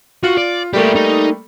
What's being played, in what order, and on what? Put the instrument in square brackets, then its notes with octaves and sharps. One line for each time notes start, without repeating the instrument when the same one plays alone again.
[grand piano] F4 [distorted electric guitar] F#4
[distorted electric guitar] D5
[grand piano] G3 A3 A#3 [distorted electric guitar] E4 G4
[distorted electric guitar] D#4